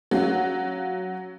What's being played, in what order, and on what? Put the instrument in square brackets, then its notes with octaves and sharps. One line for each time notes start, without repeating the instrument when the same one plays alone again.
[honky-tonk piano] F#3 [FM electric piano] C#4 F5